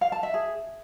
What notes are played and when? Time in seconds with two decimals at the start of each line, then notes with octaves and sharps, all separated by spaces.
0.01 F5
0.12 A5
0.23 E5
0.34 G#4